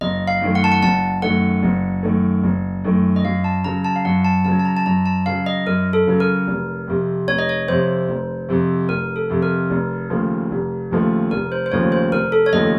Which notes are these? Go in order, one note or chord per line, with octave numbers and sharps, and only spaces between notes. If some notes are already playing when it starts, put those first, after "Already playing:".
F#1 D#5
F5
F#2 D#3 A3
F#5
A5
F#5
F#1 A5
F#2 D#3 A3 F#5
F#1
F#2 D#3 A3
F#1
F#2 D#3 A3
D#5
F#2 F5
A5
C#3 F#3 A#5
A5
F5
F#2 F#5
A5
C#3 F#3 A5
A5
A#5
A5
F#2 A#5
A5
C#3 F#3 F5
D#5
F#2 A#4
A4
C#3 F#3
A#4
F1
F2 C3
F1 C#5
D#5
C#5
F2 C3 C5
F1
F2 C3
F1 A#4
A4
F2 C3
A#4
F1
D#2 C#3 F3 A3
F1
D#2 C#3 F3 A3
F1 A#4
C5
C5
D#2 C#3 F3 A3 C#5
C5
F1 A#4
A4
C#5
D#2 C#3 F3 A3 D#5